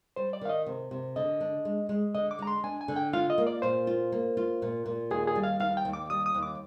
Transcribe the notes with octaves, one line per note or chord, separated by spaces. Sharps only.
G3 C5
D5
D#3 F5
D#5
C3
C3
D3 D#5
D4
G#3
G#3
D3 D#5
D6
G#3 A#5
C6
D4 G#5
G#5
D3
G5
F4 F5
D#5
A#3
D5
A#2 C5
F4
A#3
F4
A#2
A#2
D#2 G#4
G#4
G3
F5
D#2 F5
G5
D#2
D6
G3 D#6
D#6
D#2
D6